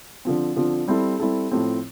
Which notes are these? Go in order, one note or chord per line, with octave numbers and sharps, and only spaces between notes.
D3 F3 C4
D3 F3 C4
G3 C4 E4 A4
G3 C4 E4 A4
A2 F3 A3 C4